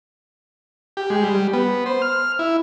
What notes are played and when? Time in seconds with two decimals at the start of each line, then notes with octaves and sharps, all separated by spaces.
0.97 G4
1.10 G#3
1.24 G3
1.53 B3
1.86 C5
2.02 F6
2.39 E4